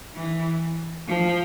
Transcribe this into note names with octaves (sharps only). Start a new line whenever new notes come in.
E3
F3